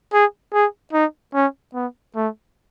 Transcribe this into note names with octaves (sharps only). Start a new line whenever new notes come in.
G#4
G#4
D#4
C#4
B3
A3